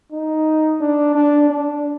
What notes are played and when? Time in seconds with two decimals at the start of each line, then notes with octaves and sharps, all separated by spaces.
0.12 D#4
0.81 D4
1.15 D4
1.50 D4